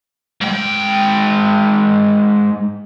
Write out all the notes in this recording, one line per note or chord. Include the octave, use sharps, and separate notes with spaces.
G#2 G5